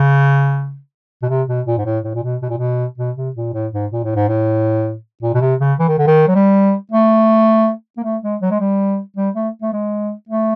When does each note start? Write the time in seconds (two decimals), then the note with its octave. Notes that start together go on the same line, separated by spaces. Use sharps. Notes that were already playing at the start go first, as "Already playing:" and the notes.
Already playing: C#3
1.22 B2
1.29 C3
1.48 B2
1.67 A#2
1.78 G#2
1.86 A2
2.04 A2
2.15 A#2
2.23 B2
2.42 B2
2.50 A#2
2.57 B2
2.98 B2
3.17 C3
3.36 A#2
3.54 A2
3.73 G#2
3.92 A#2
4.04 A2
4.16 G#2
4.29 A2
5.23 A#2
5.34 B2
5.41 C3
5.61 C#3
5.79 E3
5.88 D#3
5.98 D3
6.07 D#3
6.28 F#3
6.35 G3
6.91 A3
7.97 A#3
8.04 A3
8.23 G#3
8.42 F#3
8.51 G#3
8.60 G3
9.17 G3
9.35 A3
9.62 A3
9.73 G#3
10.29 A3